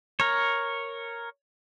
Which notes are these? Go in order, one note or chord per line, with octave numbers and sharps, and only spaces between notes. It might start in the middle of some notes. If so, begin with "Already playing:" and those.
A#4 C#5